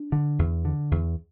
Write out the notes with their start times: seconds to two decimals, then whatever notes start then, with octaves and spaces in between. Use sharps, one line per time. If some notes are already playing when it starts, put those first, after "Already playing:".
Already playing: D4
0.12 D3
0.39 E2
0.65 D3
0.91 E2